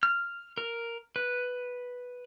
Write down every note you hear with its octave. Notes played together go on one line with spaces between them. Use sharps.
F6
A#4
B4